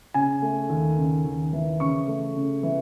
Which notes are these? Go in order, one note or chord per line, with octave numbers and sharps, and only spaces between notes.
C#3 G#5
A3
D#2
C#3
D#2
E3
C#3 C#6
A3
C#3
E3